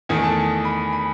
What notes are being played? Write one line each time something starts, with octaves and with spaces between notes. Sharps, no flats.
E2 D#3 A3 G#5
A5
B5
B5